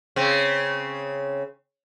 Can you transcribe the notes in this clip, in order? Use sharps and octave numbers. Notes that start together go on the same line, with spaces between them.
C#3 C4